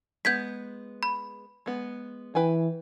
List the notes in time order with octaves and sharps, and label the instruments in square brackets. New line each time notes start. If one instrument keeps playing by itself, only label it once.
[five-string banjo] G#3 B3 [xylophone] G6 G#6 B6
[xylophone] B5
[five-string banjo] G#3 B3
[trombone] E3 [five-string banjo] B4 G5 G#5